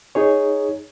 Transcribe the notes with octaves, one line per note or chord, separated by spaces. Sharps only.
D#4 G#4 C#5